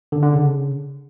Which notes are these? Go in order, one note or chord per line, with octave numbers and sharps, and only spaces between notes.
D3
D3
C#3